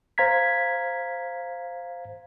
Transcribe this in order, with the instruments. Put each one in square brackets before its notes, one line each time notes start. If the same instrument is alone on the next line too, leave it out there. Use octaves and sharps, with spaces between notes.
[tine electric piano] C5 F5 A#5 G#6 B6